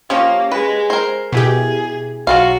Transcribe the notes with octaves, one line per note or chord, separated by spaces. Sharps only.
F3 A#3 C#4 G4 C#5
G#3 B4
A#4 C5
B2 E4 G4 G#4
B1 F#3 F4 F#4 F5